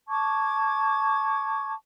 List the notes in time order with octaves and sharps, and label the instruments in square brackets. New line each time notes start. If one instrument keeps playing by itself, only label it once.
[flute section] A5 C#6 D6 G#6